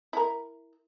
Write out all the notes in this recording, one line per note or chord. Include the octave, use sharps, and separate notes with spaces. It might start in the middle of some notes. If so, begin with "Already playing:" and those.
E4 A#4